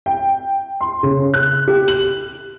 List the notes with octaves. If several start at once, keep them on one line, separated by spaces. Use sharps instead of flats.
G5
C6
C#3
F#6
G4
F#7